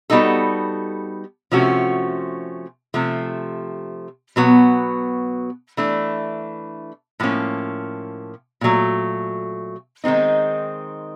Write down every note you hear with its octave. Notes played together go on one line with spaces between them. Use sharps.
G3 B3 D#4 F#4 A4
C3 F3 A3 C#4 F#4
C3 F3 A3
B2 F#3 B3
E3 A3 D4
A2 F3 A#3 C#4
A#2 F#3 A3
D#3 G#3 C4 D#4